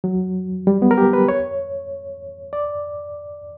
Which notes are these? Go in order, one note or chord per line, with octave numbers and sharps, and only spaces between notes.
F#3
G3
B3
A#4
G4
B4
C#5
D5